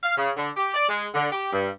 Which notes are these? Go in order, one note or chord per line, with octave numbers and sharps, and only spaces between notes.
F5
C#3
D3
G4
D5
G#3
D3
G4
G2